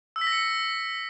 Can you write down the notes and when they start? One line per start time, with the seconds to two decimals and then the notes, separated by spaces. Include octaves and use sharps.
0.16 E6
0.21 B6
0.27 A#6
0.32 C#7